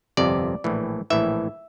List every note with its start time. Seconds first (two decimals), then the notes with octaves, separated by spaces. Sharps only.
0.17 G1 F2 C3 D5
0.64 A#1 A2 E3
1.10 A#1 A2 E3 E5